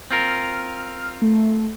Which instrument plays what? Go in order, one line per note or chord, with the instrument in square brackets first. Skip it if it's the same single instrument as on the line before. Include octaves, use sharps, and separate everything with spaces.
[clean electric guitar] C4 F4 A#4 [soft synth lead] F6
[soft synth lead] A3